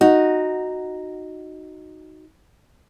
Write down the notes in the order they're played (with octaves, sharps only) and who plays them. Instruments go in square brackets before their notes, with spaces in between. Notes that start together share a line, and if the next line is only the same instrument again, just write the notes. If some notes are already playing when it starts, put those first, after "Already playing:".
[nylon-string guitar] D#4 F#4